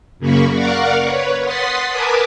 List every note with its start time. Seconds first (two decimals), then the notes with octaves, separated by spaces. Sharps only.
0.19 F#2 C#3 A#3 B5 C#6
0.53 A#4 D5 F5 F#5 C#6 D6
1.05 B4 C#5
1.43 F#5 C6 D#6 A6 B6 C7
1.90 A#4 B4 G#5 A5 D6 D#6